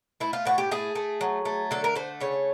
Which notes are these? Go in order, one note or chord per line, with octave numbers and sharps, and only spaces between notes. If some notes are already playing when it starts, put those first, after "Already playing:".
A3 E4
F4
A2 F#4
G4
A3 G#4
A3
F#3
A3
D3 A4
A#4
A3 C5
C#3 C#5